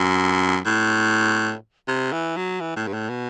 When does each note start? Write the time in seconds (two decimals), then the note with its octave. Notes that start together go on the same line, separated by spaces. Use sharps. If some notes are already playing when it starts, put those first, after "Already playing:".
Already playing: F#2
0.66 A2
1.88 C3
2.12 E3
2.37 F#3
2.60 E3
2.76 A2
2.87 G2
2.93 A2
3.09 B2